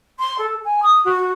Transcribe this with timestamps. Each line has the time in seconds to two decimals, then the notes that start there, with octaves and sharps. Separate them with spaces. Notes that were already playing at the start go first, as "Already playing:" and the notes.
0.19 C6
0.38 A4
0.64 G#5
0.82 D#6
1.05 F#4